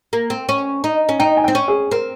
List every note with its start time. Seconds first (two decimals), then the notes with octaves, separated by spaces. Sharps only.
0.13 A#3
0.30 C4
0.49 C#4
0.84 D#4
1.09 C#4
1.19 D#4 G5
1.37 G#5
1.44 C4 G5
1.55 C#4
1.68 G#4
1.91 C4 A#4